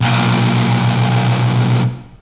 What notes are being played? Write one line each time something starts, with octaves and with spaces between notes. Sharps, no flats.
B1 A#2